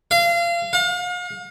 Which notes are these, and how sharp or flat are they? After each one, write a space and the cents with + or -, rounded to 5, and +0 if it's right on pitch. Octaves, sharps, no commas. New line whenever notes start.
F5 -30
F5 +40